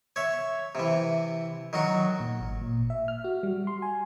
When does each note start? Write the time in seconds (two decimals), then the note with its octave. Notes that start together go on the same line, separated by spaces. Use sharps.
0.16 C#5 E5
0.75 C3 E3
1.73 D#3 F#3 F#4
2.20 A#2
2.40 G#1
2.61 A#2
2.90 E5
3.08 F6
3.24 F#4
3.43 G3
3.67 C6
3.82 G#5